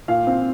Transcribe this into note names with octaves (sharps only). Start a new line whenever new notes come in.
A#2 F5
C4